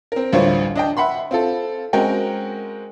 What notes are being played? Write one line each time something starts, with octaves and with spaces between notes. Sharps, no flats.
C4 A#4
A1 D2 G3 F4 C5 C#5
D4 D#5 G5
E5 F#5 B5 C6
C4 F4 A4
G#3 C4 C#4 F#4 A#4 G5